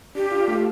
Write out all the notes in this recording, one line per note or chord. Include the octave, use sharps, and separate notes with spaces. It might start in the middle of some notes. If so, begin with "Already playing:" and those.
D4 G4
F4
A3